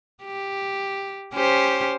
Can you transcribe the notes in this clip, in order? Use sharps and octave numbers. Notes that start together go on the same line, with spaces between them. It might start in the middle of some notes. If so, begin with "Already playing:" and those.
G4
C#4 G4 C5